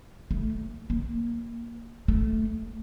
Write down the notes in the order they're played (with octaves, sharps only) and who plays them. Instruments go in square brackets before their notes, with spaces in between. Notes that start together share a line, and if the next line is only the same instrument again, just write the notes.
[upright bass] A3
A#3
A3